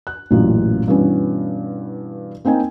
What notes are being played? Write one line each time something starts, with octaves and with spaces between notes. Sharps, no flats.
F#6
A1 F#2 A#2 E3
G2 B2 E3 B3 C#4
A#3 C4 D#4 G5 G#5